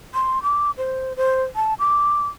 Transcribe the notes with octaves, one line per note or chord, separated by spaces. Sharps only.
C6
D6
C5
C5
A5
D6